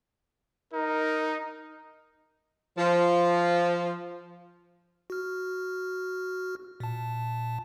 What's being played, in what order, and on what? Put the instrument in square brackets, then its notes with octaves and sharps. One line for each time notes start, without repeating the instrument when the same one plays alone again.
[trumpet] D#4 [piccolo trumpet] A#4
[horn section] F3
[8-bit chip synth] F#4 F6
A#2 A5